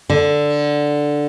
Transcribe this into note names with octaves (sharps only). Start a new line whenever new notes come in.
D3